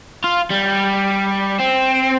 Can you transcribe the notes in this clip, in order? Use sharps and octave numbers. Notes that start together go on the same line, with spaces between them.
F4
G3
C4